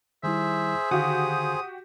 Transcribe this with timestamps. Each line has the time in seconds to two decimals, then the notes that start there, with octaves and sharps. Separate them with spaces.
0.23 D#3 G3 E4 G#4 C5 E5
0.91 D3 D#3 F#4 G4 F5 D#6